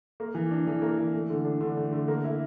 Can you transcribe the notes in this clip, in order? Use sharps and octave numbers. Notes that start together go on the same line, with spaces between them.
A#3
E3
D4
E3
A#3
E3
A3
D3
D4
D3
A3
D3
A#3
E4